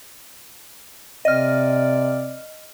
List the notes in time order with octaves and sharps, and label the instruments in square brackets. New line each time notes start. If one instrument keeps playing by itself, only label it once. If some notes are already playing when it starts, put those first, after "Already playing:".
[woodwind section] C3 C4 D5 [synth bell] D#5 F6